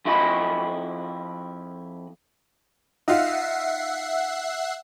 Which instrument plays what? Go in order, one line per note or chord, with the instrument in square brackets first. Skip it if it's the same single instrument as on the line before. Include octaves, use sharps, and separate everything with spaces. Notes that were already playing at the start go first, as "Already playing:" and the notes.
[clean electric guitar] F2 E4 F4 D#5 G#5 B5
[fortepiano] D#4 F4 [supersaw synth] E5 F#5 C7